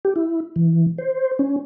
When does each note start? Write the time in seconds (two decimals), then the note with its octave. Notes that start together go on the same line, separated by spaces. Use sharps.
0.05 G4
0.16 E4
0.56 E3
0.98 C5
1.39 C#4